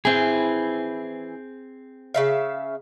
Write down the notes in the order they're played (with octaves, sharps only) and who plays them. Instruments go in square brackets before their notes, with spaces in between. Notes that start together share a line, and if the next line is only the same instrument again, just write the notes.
[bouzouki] E3 E4 [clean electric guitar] C4 G#4
[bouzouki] C#3 E5 F5